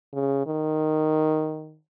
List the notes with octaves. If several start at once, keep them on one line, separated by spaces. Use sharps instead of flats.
C#3
D#3